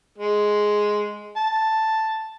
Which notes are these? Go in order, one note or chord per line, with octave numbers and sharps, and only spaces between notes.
G#3
A5